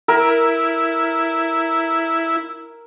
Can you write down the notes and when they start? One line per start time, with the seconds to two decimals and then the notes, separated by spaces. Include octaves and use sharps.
0.08 E4 A#4